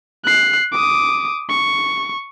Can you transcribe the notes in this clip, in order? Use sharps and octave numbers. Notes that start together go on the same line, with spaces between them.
F#6 C7
D6 D#6
C#6